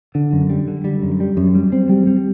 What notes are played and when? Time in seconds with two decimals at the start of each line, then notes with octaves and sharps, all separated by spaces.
0.15 D3
0.33 F#2
0.50 G3
0.68 D3
0.85 G3
1.02 F#2
1.20 G3
1.37 F#2
1.55 G3
1.73 C4
1.89 G3
2.07 G3